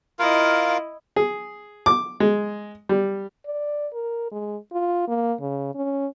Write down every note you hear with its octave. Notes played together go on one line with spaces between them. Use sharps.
E4 F4 A#4 D#5 F5
G#4
D6
G#3
G3
D5
A#4
G#3
F4
A#3
C#3
C#4